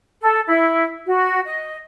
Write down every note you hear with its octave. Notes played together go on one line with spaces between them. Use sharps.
A4
E4
F#4
D#5